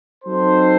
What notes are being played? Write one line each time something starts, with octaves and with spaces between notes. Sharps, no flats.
F#3 C4 D#4 A4 C5